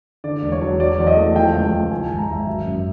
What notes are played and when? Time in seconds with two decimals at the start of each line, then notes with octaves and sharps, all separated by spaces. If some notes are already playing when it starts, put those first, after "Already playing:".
0.24 D3 D5
0.42 E1
0.52 C#5
0.62 F#3
0.80 F#3 D5
0.99 E2
1.07 D#5
1.17 A3
1.35 F3 G5
1.54 C#2
1.72 C#2
1.91 D#3 G#5
2.06 G#1 A5
2.19 A#5
2.28 G#1 E5
2.47 F#3
2.65 F#2